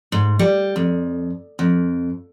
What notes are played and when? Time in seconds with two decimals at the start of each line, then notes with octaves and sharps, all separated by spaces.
0.12 G#2
0.39 G3
0.76 F2
1.59 F2